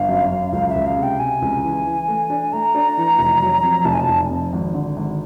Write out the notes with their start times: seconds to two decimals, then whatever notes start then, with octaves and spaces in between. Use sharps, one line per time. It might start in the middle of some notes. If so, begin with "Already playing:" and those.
Already playing: G1 F5
0.09 F#2
0.31 F#2
0.52 C#2 F5
0.69 E5
0.75 C#2
0.86 F5
0.97 C3
1.03 G5
1.19 C3 G#5
1.42 C#2
1.64 E3
1.85 E3
2.08 A3
2.30 D4
2.53 A3 A#5
2.75 D4
2.97 E3
3.19 F1
3.41 F#3
3.63 F2
3.85 F1 A5
3.93 G#5
4.00 A5
4.08 F1
4.30 F2
4.53 G#1
4.74 D3
4.97 G#1